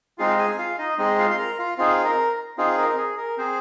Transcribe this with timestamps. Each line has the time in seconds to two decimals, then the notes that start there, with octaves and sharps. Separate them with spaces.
0.18 G#3 C4 D#4 F4 G#4 F5
0.38 G#4 G#5
0.58 F4 F5
0.78 D#4 D#5
0.98 G#3 C4 D#4 G#4 D#5
1.19 F4 F5
1.31 C6
1.38 A#4 A#5
1.58 F4 F5
1.78 C4 D#4 F4 G#4 F5
2.05 A#4 A#5
2.58 C4 D#4 F4 G#4 F5
2.78 A#4
2.97 G#4
3.17 A#4
3.37 C4 G#4 C5